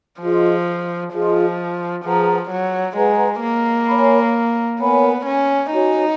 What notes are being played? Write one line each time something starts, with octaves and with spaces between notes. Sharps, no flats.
F3 F4 G#4 D#5
F3 F4 G#4 D#5
F3 G#4 B4 F#5 A#5
F#3
G#3 G#4 B4 F#5 A#5
A#3
A#4 C#5 G#5 B5
B3 A#4 C#5 G#5 B5
C#4
D#4 F#4 C#5 G#5